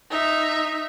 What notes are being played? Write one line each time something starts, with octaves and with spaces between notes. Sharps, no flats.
D#4 E5